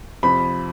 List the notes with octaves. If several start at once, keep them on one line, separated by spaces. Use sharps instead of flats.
F2 C3 F3 B5